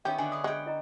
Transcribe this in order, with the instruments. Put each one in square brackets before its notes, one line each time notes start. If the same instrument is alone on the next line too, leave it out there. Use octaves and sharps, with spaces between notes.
[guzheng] D#3 B3 C#4 [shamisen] G4 [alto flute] E5
[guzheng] D3 F#4 [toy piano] G#5
[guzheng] G#4 B4 [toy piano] D#6
[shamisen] G#3 [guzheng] F#5 G5
[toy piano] E4 D#5 A#5